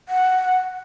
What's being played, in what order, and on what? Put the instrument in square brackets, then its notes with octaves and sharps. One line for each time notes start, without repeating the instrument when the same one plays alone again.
[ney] F#5